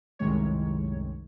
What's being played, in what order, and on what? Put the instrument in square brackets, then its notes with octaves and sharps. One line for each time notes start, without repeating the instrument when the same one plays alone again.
[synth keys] C2 F#2 A2 D#3 G#3 C#5